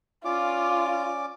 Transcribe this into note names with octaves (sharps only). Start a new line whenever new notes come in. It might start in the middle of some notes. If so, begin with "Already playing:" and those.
C#4 F4 D5 D6